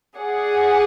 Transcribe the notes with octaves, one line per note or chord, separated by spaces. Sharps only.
G#4 D5 F#5